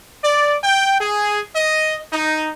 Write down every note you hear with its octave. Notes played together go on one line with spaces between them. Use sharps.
D5
G5
G#4
D#5
D#4